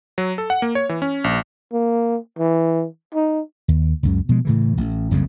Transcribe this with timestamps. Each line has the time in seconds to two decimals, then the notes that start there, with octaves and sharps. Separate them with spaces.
0.18 F#3
0.38 A4
0.50 F#5
0.62 A#3
0.75 C#5
0.89 E3
1.02 C#4
1.24 A#1
1.72 A#3
2.38 E3
3.14 D#4
3.68 D#2
4.03 C#2 F#2 C#3
4.29 B2 F3 G#3
4.45 A2 C#3 E3
4.77 A1
5.11 F#1 C2 F2 C#3